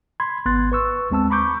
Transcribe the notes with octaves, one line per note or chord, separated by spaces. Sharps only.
B5 C6 G#6
G#1 B3 C6 F#6 A6
B4 C#6 E6
D#2 G#3 C4 A5 E6
A#5 B5 C#6 D6 G6